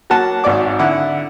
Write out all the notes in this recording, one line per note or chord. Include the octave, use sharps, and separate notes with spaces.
F#3 A#3 F#5 A5
G#1 G#2 F#3 D5 D6
D3 E4 F#5